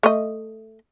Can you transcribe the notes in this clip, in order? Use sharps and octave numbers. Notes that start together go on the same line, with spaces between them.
A3 D#5